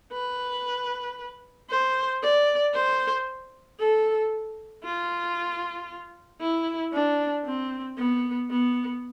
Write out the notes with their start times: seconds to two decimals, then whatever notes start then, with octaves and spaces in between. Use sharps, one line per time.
0.12 B4
1.70 C5
2.22 D5
2.74 C5
3.79 A4
4.84 F4
6.41 E4
6.93 D4
7.45 C4
7.97 B3
8.50 B3